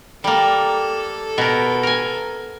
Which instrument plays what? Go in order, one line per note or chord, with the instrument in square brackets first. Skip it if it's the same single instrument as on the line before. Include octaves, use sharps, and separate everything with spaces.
[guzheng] G3 A#3 [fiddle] A4
[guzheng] B2 A#4
A#4 G#5